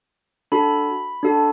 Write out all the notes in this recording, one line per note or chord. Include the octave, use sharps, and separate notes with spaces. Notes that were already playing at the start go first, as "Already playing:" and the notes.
D4 F#4 A4 B5
D4 F#4 A4